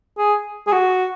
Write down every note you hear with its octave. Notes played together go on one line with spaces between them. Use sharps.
G#4
G#4
F#4